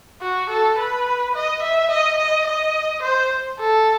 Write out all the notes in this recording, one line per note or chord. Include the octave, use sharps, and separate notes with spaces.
F#4
A4
B4
D#5
E5
D#5
D#5
D#5
C5
A4